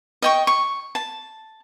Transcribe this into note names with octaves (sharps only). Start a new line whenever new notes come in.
D#5 G5 C#6
C#6
A5